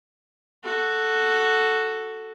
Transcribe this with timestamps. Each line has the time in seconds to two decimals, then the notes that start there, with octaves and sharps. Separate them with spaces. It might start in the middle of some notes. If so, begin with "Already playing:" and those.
0.64 F#4 A4